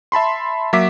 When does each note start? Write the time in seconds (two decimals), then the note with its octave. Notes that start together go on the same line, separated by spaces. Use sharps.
0.12 E5 A5 B5 C6
0.73 F#3 A#3 E5 D6 B6